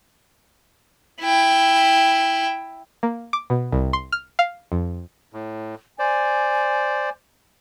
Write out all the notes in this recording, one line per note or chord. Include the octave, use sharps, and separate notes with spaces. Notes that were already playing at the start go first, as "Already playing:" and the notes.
E4 G5
A#3
D6
B2
C2
C6
F6
F5
F2
A2
C5 D5 G#5